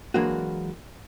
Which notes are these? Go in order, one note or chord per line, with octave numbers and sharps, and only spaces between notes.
E3 F#3 G#3 A#3 D4 F#4